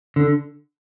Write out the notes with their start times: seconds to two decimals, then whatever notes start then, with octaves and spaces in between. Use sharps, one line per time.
0.16 D3